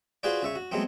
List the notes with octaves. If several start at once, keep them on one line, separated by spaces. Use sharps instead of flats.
F4 F#4 G#4 B4 C5 D5
C#3 E5 C#6
F#4
F#3 G#3 A3 B3 C4